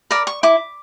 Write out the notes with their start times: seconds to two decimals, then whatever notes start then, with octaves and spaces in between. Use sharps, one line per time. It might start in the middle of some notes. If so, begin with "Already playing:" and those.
0.11 A#4 D5 B5
0.27 C#6
0.43 E4 D6